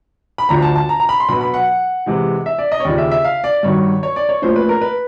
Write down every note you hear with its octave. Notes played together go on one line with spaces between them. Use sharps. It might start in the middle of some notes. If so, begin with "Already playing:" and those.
B5
D2 D3 F3 A#5
A5
A5
A#5
A#5
B5
C6
B2 F#3 B3 B5
B5
F#5
C3 E3 G#3
E5
D5
D#5
C#5
D#2 C#3 F3 D5
E5
E5
F5
D5
G2 D#3 F#3 C#5
C#5
D5
C#5
A#2 F3 A3 C#4 C5
B4
A#4
B4